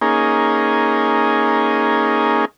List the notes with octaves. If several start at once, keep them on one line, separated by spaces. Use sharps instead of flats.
A#3 C#4 D#4 G#4